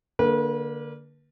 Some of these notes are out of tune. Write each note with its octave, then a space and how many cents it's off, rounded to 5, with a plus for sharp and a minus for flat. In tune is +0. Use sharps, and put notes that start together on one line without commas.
D3 +0 A#3 +0 B4 -35